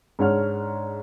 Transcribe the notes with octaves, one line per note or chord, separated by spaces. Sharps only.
G#2 D4 C#5 F#5 F6